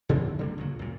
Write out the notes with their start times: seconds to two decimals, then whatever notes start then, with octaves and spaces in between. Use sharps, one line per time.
0.09 F#2 C#3 C4
0.39 D3 G3 A#3
0.58 C#2 A#2 F#3
0.79 F#2 A#2